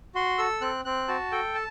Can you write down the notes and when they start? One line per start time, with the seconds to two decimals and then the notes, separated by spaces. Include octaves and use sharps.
0.15 F#4 C6
0.38 A4 E6
0.61 C4 F#6
0.85 C4 F#6
1.08 F#4 A5
1.32 A4 G5
1.55 A5